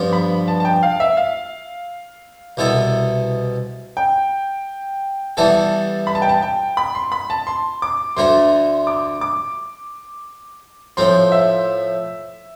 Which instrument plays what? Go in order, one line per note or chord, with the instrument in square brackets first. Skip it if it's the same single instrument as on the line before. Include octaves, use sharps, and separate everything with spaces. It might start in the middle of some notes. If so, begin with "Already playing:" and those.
Already playing: [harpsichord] G2 F3 B3 D4
[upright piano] B5
A5
A5
G5
F5
E5
F5
[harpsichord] C2 B2 B3 E4 A4
[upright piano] G5
[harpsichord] E3 G3 B3 E4 A4 [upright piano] A5
[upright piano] B5
A5
G5
A5
G5
B5
C6
B5
A5
C6
D6
[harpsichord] D2 D3 A3 D4 [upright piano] C6
[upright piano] D6
D6
[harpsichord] A2 F3 C4 [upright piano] C6
[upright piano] E5